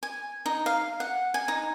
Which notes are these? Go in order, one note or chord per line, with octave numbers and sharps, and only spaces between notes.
G#5
D#4
F5
F#5
G#5
D#4